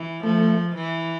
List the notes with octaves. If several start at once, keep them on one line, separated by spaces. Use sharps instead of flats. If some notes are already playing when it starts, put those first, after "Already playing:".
Already playing: E3
F3 A3
E3